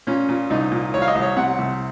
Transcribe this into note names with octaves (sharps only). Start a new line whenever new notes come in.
A#2 C#4
A#2
C2 D#4
A#2
C2 C#5
F5
D#5
C2
C#5
C3 F#5
C2